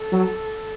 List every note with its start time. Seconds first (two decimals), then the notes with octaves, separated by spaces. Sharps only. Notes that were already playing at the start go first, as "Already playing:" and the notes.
Already playing: A4
0.12 F#3